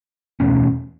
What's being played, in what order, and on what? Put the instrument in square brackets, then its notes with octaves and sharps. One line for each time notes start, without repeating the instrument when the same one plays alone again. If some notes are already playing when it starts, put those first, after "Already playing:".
[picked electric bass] E2 B2 A3 C#4